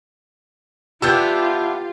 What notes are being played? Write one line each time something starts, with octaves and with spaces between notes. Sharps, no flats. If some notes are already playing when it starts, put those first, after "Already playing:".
B3 D4 E4 F4 G4 B4 E6 G6